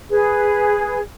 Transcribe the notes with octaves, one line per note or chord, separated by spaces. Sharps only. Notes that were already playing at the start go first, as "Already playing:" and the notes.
G#4 B4